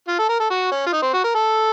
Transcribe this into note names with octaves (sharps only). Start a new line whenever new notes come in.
F4
A4
A#4
A4
F#4
C#4
F4
D#4
C4
F#4
A#4
A4